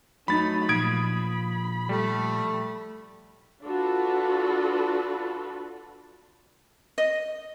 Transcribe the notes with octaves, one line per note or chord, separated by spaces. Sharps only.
F#3 A3 D#4 B5 A6
A#2 F3 B5 D#6 G#6 D7
G3 A3
D4 F4 F#4 A4 B4
D#5